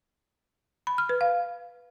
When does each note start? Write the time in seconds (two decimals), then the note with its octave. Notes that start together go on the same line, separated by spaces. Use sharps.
0.87 B5
0.98 F6
1.09 B4
1.21 F5